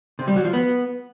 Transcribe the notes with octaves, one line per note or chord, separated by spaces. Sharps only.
C3
G3
F#3
F3
B3